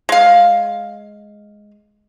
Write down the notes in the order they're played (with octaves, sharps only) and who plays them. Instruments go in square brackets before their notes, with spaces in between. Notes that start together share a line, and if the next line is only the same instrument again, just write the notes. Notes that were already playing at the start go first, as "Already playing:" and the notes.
[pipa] G#3 F5